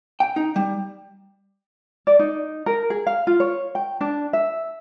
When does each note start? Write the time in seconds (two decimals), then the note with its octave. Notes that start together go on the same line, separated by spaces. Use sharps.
0.20 G5
0.36 D#4
0.56 G3
2.07 D5
2.19 D#4
2.66 A#4
2.90 G#4
3.07 F5
3.27 F4
3.40 C#5
3.75 G5
4.01 D4
4.33 E5